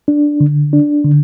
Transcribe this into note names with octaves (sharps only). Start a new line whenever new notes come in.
D4
D3
D4
D3